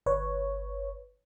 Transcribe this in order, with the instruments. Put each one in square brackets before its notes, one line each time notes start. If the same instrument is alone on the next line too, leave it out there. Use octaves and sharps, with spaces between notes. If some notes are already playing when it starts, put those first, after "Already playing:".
[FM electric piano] G1 B4 C#5